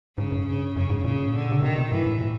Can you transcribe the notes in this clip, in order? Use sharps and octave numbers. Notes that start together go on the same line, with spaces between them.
G#2 C#3
G2
C#3
F#2 C#3
G#2
A#2 C#3
D3
C#3
C3 D#3
B2
G#2 E3
A2
A#2